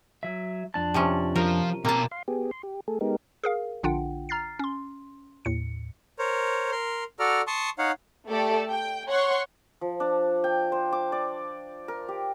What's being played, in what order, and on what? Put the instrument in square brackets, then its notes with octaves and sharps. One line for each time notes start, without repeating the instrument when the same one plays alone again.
[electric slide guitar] F#3 E5
F2 D4 A5
[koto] C3 F3 C#4
[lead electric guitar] F3 [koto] A#4
[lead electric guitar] B2 A#5 [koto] A#3 A5 [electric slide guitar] C4
[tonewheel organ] F5 C6
B3 G4 G#4
C6
G4
A3 G#4 A4
G#3 B3 D#4 G4 A#4
[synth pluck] G#4 A#4 F5
A#1 D3 D4 F4 F#5 G5
A#5 F6 A6 C7
C#4 C6
D#2 A2 C#7
[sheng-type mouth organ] A#4 C5 C#5
A#4 C6
F#4 A4 D5 A#5 F6
A5 C6 C#6 D#6
D#4 C#5 F5 F#5
[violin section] A3 G4 A4 D5
G5
C#5 F#5 C6 C#6
[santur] F3
D4
G5
C5
D6
D5
A#4
G4